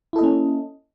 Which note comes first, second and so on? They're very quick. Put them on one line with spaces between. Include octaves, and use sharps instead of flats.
E4 A4 D#5 A#3 C#4